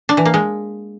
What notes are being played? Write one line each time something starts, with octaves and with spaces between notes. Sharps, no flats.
D4
E3
A#3
G#3